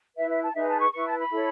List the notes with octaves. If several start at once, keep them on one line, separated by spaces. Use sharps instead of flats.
E4 B4 E5
E5
A5
D#4 G#4 B4 E5
A5
C#6
E4 B4 C#6
A5
B5
E4 A4 C#5